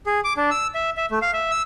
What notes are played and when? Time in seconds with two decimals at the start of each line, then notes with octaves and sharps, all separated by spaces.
0.06 G#4
0.24 D6
0.37 D4
0.51 E6
0.75 E5
0.97 E5
1.11 A3
1.22 F5
1.33 E5
1.51 E6